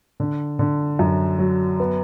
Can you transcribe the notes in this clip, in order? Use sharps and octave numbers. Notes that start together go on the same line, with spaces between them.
D3
D3
F#2
F#3
B3